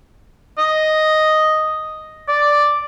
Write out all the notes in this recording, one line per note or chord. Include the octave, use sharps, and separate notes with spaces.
D#5
D5